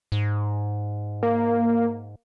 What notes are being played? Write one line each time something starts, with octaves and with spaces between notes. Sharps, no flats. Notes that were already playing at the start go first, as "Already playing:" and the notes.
G#2
A#3